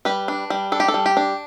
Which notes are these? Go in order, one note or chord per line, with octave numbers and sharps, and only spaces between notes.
G3 B4
D4
G3
D4 A4
G4
A4
G3
G4
D4